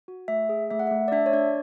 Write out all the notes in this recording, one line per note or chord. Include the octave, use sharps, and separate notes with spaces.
F#4
A3 E5
G#4
A3 E5
F#5
E5
A3
D5
D4 E5
C#5
D4 D5